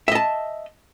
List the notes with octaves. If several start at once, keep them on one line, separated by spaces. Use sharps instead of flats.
D#5 E5 A5